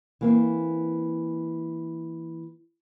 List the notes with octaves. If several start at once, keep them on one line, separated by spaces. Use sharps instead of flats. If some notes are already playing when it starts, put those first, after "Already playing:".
E3 A#3 C4